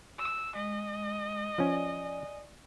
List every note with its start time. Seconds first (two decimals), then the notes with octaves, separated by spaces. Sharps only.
0.19 E6
0.55 G#3 D#5
1.58 F3 C#4 D5 G#5